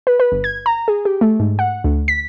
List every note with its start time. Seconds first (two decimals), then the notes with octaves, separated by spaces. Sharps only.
0.07 B4
0.20 B4
0.32 G1
0.44 G#6
0.66 A#5
0.88 G#4
1.05 G4
1.21 A3
1.40 G#2
1.59 F#5
1.84 D2
2.08 B6